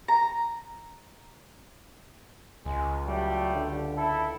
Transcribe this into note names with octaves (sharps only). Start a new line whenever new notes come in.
A#5
C#2 G#3
F#3 G3 A3
D3
E4 A4